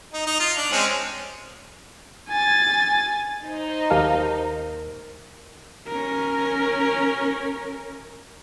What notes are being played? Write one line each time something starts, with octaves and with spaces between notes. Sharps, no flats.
D#4
D#4
F4
D4
G#3 C4 C#4
G#5 A6
D#4 C5
D#2 G4 A#4 F5 A5 F6
C#4 A#4